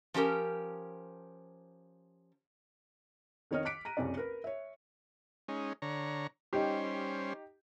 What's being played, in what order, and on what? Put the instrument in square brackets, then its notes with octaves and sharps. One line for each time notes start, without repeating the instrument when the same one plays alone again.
[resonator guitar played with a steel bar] F3 C#4 G4 A#4
[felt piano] F2 D#3 C#5 D#5 F6
D6 F#6 B6 C#7 D7
A#5 A#6 D#7
F#1 C2 F2 C#4 D5
A#4 B4
C#5 E5
[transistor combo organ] G#3 C#4 D#4
D3 C#5 A#5
[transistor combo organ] G3 C#4 C5 [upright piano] D#4 G4